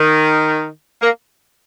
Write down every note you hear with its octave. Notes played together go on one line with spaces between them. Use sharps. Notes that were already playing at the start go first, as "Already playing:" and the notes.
Already playing: D#3
A#3